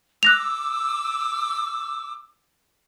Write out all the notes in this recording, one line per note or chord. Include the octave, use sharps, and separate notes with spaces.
D6 E6 F#6 A#6 F7